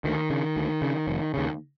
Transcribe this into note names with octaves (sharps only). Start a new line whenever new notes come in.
D2 D#3
C#3
D2
C#3
F1
D#2 C#3